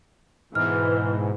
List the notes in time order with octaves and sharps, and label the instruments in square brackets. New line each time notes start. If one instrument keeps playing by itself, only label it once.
[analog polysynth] G#2 B2 [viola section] E3 [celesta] F6